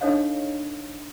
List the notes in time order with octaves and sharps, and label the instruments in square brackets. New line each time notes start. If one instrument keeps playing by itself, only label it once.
[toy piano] D4 D#4 A4 C#5 D#5 F5